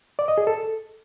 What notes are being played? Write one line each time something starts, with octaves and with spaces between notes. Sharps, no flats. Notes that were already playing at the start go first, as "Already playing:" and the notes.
D5
D#5
G#4
A4